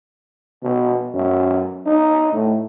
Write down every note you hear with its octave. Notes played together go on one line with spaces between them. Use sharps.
B2
F#2
D#4
A2